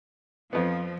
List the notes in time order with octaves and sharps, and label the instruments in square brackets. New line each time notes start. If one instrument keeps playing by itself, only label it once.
[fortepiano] F2 B3 [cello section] F3